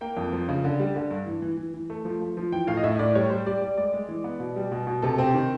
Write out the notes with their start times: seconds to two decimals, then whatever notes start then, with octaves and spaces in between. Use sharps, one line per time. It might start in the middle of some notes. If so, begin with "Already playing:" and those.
0.01 A#3 G5
0.17 F2
0.33 F3
0.49 C#3
0.64 D3
0.79 G3
0.96 D3
1.11 G2
1.26 E3
1.42 E3
1.57 E3
1.74 E3
1.90 A3
2.05 F3
2.20 F3
2.37 F3
2.52 E3 G5
2.67 A2 F5
2.77 D#5
2.84 A2 E5
2.99 A2 D5
3.15 G3 C#5
3.30 G3 C5
3.46 G3 D5
3.61 G3 D5
3.78 G#3 D5
3.93 G#3
4.08 E3
4.24 B3
4.40 B2
4.56 G3
4.72 B2
4.87 B2
5.02 C3 A4
5.18 C4
5.24 G4
5.34 D#3